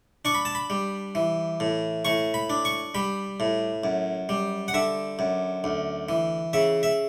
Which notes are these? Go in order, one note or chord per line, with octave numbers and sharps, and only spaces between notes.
D4 C#6
B5
A5
B5
G3
E3
A2
A2 C#6
B5
D4
C#6
G3 B5
A2
F#2
G3
F#5
D3 E5
F#2
D2
E3
C#3 E5
E5